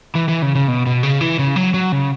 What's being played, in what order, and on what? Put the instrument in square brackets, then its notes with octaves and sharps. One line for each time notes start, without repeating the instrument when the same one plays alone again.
[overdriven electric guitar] E3
E3
C#3
C#3
B2
B2
C#3
E3
C#3
F#3
F#3
C#3